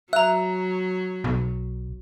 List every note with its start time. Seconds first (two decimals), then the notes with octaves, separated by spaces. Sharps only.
0.13 F#3 E5 A#5 F#6
1.24 B1